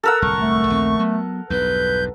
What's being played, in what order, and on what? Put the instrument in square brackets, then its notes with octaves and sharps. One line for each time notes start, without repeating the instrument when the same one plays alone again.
[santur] A4 A#4 F#5 [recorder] E6
[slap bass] D1 C2 [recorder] C#6
[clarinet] A3
[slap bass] A#1 D#2 C4
F#3 B3
[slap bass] B1 E2 G2 [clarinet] B4 [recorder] G6